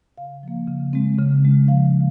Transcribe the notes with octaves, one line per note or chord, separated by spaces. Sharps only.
C#3 F5
F3 A#3
C#3
G#3 C4
C#3
G#3 C#4
F3 F5
A#3